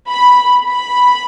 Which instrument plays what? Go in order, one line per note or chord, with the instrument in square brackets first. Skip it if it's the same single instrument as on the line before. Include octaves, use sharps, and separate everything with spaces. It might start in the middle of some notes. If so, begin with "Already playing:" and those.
[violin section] B5
B5